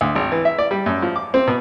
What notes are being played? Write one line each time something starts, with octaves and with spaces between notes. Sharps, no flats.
D2
G#1
E3
E5
D5
G3
F#2
F3
D6
C4
B2